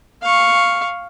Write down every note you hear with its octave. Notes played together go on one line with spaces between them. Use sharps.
F5 C#6